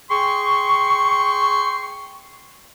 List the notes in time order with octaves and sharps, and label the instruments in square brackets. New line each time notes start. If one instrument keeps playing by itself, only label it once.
[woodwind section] G#4 G5 C6 C#6